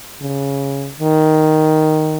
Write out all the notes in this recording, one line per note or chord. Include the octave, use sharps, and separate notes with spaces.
C#3
D#3